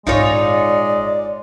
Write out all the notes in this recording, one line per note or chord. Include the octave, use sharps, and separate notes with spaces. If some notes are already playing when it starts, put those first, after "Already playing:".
G#1 A#2 G#3 D#4 F4 C#5 D5